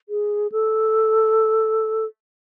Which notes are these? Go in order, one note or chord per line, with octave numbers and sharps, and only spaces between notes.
G#4
A4